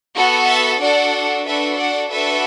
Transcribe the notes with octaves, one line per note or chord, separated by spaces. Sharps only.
B3 F#4 A4
E5 A5
D4 F#4 A4 D5 F#5
D4 F#4 A4 B4 E5
D5 F#5
D4 F#4 A4 B4 E5